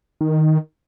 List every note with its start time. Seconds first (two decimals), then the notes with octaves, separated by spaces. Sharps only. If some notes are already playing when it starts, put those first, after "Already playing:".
0.21 D#3